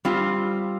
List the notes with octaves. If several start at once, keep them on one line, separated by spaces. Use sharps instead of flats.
G3 C4 F4